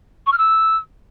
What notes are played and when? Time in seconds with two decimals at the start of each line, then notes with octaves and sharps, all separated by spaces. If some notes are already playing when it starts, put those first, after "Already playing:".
0.26 C#6
0.32 F6
0.38 E6